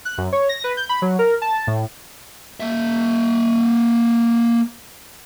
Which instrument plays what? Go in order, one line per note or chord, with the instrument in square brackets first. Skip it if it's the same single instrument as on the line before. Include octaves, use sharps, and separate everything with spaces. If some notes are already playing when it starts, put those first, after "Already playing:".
[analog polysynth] F#6
F#2
C#5
A#6
B4
G6
B5
F#3
A#4
A5
A2
[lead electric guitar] A#3 E5